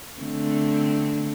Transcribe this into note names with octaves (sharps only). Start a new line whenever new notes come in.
D3 A3 C4